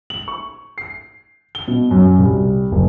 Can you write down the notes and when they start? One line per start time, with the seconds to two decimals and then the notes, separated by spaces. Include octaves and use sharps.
0.10 F#7
0.28 C#6
0.78 C7
1.55 G7
1.68 B2
1.91 F#2
2.19 C2
2.72 F#1